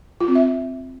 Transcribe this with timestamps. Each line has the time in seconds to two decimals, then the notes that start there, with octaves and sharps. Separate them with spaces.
0.20 F4
0.28 C4
0.35 E5